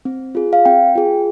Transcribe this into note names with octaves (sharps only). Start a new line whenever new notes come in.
C4
F4 G#4
F5
C4 G5
F4 G#4